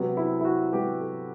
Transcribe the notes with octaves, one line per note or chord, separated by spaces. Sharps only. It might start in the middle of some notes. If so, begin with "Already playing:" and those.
Already playing: C3 F#3 B3
E4
E4
F#4
C3 F#3 B3 G4
A4